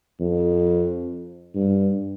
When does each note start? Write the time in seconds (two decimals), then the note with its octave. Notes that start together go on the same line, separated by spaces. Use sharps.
0.20 F2
1.55 G2